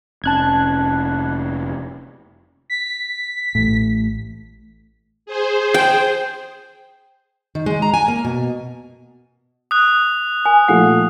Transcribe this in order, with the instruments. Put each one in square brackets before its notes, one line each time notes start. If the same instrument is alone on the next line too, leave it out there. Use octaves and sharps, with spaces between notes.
[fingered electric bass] F1 C#4 [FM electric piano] A5 F#6 G#6
[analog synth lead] B6
[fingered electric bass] A1 A2
[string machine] G#4 C5
[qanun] G5
[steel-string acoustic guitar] D#3
G#3
A#5
G#5
A#3
B2
[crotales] D#6 F#6
[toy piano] G#5
[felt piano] A#2 F3 A3 [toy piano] F#5